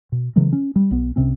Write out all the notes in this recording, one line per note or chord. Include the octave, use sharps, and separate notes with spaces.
B2
C#3 E3 F#3 G#3
C#4
G3
B1 B3
C2 C3 C4 C#4